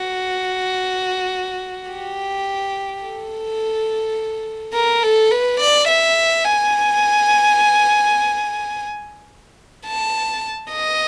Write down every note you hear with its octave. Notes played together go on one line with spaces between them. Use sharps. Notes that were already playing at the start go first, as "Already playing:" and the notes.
Already playing: F#4
G4
A4
A#4
A4
B4
D5
E5
G#5
A5
D#5